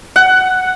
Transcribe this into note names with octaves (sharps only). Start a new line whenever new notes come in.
F#5